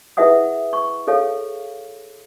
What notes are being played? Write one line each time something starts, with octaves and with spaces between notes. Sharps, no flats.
E4 G#4 B4 E5 F#5 D#6
C#6
G#4 A4 C#5 F5